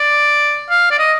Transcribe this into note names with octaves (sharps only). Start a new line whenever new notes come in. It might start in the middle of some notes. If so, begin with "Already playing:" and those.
Already playing: D5
F5
D5
D#5